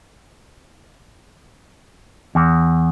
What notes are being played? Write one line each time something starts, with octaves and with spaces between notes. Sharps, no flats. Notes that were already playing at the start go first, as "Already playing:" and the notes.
E2